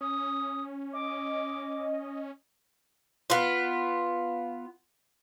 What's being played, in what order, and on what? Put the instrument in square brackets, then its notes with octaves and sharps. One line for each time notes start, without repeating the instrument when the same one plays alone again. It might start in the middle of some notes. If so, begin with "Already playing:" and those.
[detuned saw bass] C#4 [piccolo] D#6
[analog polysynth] D#5 [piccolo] D6
[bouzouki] B3 F4